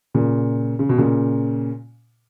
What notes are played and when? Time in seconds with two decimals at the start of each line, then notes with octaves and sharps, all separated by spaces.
0.14 A#2 C#3
0.79 C#3
0.89 B2
0.98 A#2 C#3